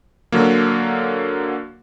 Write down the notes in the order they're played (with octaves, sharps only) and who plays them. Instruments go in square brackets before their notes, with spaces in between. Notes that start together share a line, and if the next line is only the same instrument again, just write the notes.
[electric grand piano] D3 F#3 A#3